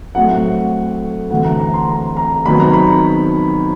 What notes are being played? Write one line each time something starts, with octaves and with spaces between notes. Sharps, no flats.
A2 F#3 A3 C4 F#5
D2 C3 E3 A3 C4 F#5
A#5
A#5
C6
A#5
A#5
C3 D#3 F#3 B3 B5
A#5
B5